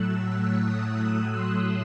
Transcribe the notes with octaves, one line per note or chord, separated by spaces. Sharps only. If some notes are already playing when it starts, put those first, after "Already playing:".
Already playing: A2 F#3 A3 E6 F#6
D#6
C6